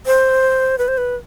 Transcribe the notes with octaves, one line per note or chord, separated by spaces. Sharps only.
C5
B4
C5
B4